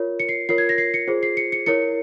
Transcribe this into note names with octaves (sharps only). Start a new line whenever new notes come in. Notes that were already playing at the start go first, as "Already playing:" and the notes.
Already playing: F4 A#4 C#5
C#7
C7
F4 A#4 C#5 C7
G#6
A#6
C7
C#7
F4 G#4 C5
C7
C#7
C#7
E4 A#4 C#5 C#7